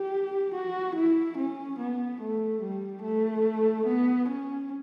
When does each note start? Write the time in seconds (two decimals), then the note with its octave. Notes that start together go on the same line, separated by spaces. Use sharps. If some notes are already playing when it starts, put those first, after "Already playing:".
Already playing: G4
0.54 F#4
0.96 E4
1.37 C#4
1.79 B3
2.21 A3
2.62 G3
3.03 A3
3.86 B3
4.29 C#4